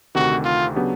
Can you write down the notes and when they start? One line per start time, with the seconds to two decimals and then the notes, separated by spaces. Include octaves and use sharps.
0.15 D2 C3 D#3 F#4
0.45 F4
0.76 C#3 F#3 B3 D4 G4